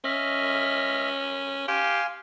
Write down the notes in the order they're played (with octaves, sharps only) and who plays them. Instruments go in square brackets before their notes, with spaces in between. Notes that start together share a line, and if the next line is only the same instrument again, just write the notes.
[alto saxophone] C#4 [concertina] D#5 E5 F6
[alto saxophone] G4 [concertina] F5 G#5 C6